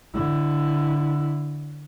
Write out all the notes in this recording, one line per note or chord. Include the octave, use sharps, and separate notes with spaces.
D3 E4